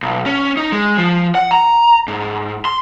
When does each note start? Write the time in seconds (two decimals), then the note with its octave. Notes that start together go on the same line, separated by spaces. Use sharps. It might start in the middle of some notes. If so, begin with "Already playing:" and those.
0.03 B1
0.26 C#4
0.57 D#4
0.72 G#3
0.98 F3
1.35 F#5
1.51 A#5
2.08 G#2
2.65 C6